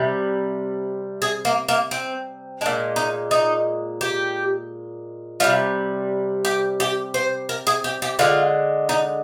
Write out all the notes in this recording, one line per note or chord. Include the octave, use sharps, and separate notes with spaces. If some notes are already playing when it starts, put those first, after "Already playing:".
Already playing: C3 G3
G#4
A#3
A#3
C4
A#2 G#3 D4
D#4
D#4
G4
C3 G3 F4
G4
G4
C5
A#4
G#4
G4
G4
D3 G#3 F4
D#4